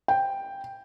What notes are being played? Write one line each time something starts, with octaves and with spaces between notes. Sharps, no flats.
G5